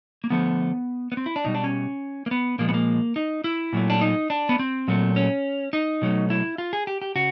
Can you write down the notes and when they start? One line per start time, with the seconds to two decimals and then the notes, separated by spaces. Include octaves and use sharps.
0.24 A#3
0.30 D3 F3 A3 B3
1.12 B3
1.17 C4
1.26 E4
1.36 D4
1.45 B2 G3 D#4
1.55 D4
1.64 C#4
2.26 A#3
2.31 B3
2.58 A#2 F3 G#3 A#3
2.69 B3
2.74 A#3
3.16 D#4
3.44 E4
3.73 A#2 F#3 A3
3.90 D4
4.01 D#4
4.30 D4
4.49 B3
4.59 C4
4.88 A#2 F#3 A3
5.16 C#4
5.73 D#4
6.02 B2 F#3 A3
6.30 E4
6.58 F4
6.73 G#4
6.87 G4
7.02 G4
7.15 C#3 F#4